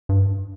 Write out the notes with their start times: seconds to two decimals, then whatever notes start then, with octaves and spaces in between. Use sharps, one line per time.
0.09 G2